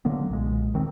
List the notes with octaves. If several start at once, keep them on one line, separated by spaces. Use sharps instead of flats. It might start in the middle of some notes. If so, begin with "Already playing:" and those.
D3 F#3 A#3 B3
B1 A#2 G#3
D#1 D#3 C4